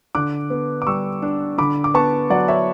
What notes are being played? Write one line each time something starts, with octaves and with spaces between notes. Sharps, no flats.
D3 D6 F#6
B3
D6
G3 C#6 E6
D4
D3 B5 D6
D6
B3 A5 C#6
F#3 D5 F#5
C#5 E5